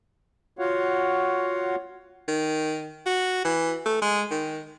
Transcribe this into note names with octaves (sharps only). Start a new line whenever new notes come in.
F4 F#4 C#5 F5 F#5
D#3
F#4
E3
A3
G#3
D#3